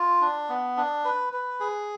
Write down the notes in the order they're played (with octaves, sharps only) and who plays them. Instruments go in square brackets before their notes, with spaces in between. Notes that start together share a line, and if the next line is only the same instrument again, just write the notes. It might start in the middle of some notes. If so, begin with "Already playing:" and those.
Already playing: [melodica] F4
D4
B3
D4
B4
B4
G#4